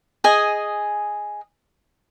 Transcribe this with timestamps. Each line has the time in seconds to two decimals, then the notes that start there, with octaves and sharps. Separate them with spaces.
0.24 G#4 D#5 G#5